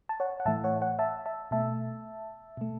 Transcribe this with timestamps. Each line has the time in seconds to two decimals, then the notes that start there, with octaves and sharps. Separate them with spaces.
0.09 A5
0.20 C#5 F#5
0.40 F#5
0.46 A2 E3 A3 E5 A5
0.64 C#5 F#5
0.82 C#5 F#5
0.99 E5 A5
1.26 E5 A5
1.51 B2 A3 E5 A5
2.57 B2 A3